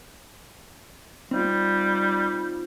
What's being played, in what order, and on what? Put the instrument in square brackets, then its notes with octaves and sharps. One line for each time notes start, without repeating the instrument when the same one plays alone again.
[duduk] G3 [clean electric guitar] C4 D#4 F4